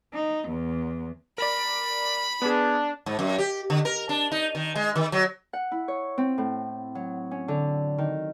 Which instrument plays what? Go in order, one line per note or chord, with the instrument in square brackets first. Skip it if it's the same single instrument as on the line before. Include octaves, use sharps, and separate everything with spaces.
[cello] D#4
E2
[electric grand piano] A#4 D5 [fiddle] B5
[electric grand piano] B3 G#4 [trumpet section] D4
[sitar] G#2
F#2
G4
D3
A#4
D4
D#4
D#3
G#3
D#3
F#3
[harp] F#5
E4
C#5
C4
A2
F#3
C#4
D3
D#3